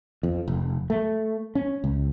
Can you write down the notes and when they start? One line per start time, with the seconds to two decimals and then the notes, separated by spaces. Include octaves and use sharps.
0.23 F2
0.48 F1
0.90 A3
1.55 C#4
1.84 C#2